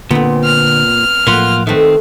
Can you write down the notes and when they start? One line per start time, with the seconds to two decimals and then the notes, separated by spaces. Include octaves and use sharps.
0.11 A#2 D3 B3 C4 D4
0.44 F6
1.27 A2 F3 F#3 A#3 F4 B4 F#5
1.67 D#3 A3 C4 B4